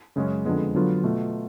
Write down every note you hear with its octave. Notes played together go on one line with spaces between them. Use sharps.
F#2 C#3 G#3 C#4
F2 D3 F3 G#3 B3
D3 F#3 B3 F4
B2 A3 F4